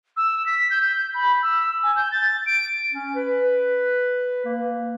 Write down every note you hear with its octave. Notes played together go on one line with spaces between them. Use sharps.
E6
B6
G6
G6
B5
E6
G#5
G6
A6
D7
C#4
B4
A#3